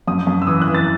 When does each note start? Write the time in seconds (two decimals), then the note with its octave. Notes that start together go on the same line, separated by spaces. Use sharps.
0.08 F#2 D#6
0.27 F#2
0.42 E6
0.47 E3 D#6
0.62 F#6
0.68 E3
0.74 A6